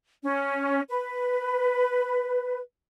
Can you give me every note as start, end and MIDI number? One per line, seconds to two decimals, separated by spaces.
0.24 0.81 61
0.89 2.59 71